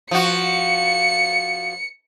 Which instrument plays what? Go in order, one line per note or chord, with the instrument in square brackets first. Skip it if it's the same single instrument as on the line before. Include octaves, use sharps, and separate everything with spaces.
[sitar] F3 F#4 [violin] C#7